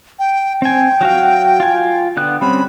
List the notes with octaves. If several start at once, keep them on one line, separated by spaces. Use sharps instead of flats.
G5
C4 G5 G#5
F#3 F#4 F5
F4 G#5
D3 B3 F#6
G3 C4 C#4 B5